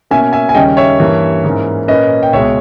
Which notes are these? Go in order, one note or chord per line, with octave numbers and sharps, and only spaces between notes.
B2 A#3 C#4 E5 G#5
E5 G#5
G#5
D#2 C#3 G3 A#3 C#4 D#5 G5
C#5 E5
G2 E3 A#3
G#2 E3 A#3 C#4
A#2 A#3 C#4 B4 D#5
G5
C#2 B2 G#3 C#5 E5